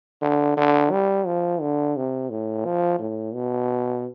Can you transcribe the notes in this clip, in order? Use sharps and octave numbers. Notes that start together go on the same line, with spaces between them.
D3
D3
G3
F3
D3
C3
A2
F3
A2
B2